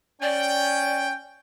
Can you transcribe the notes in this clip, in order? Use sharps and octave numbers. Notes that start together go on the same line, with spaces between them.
C#4 D5 G5